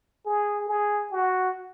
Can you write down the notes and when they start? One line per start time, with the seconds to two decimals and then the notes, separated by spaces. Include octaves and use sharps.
0.26 G#4
0.68 G#4
1.12 F#4